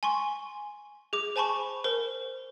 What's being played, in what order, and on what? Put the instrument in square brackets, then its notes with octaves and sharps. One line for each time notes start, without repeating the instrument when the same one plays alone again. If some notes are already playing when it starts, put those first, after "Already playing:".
[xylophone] G#5 C6 C#6
G#4 D6
C5 G#5 A5 B5 C#6
A#4 C5